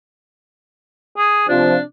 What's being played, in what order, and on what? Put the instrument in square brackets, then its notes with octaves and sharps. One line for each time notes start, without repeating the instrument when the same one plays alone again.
[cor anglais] G#4
[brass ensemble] C3 F3 [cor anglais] D4